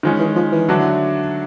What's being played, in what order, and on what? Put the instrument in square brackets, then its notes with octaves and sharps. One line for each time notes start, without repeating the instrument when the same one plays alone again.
[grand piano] D#3 G#3 C#4 [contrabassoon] F3
[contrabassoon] E3
F3
E3
[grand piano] D3 F#3 A3 D4 F#4